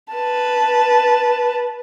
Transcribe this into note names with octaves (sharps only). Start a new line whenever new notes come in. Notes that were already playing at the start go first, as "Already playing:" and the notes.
B4 A5